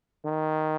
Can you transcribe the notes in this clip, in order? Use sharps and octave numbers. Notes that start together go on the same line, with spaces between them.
D#3